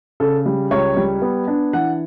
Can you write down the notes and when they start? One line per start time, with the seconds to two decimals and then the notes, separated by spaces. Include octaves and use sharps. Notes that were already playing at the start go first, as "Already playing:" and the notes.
0.20 C#3 A4
0.46 G3
0.71 C#2 C#5
0.97 G3
1.22 B3
1.47 D4
1.73 E3 F#5